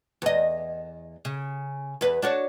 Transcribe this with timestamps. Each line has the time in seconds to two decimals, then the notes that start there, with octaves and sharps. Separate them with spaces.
0.22 E2 D#5
1.25 C#3
2.01 E2 B4
2.22 D4 F#4 C#5